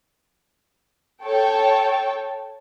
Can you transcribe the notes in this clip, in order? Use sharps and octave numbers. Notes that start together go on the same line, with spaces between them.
A4 C#5 G5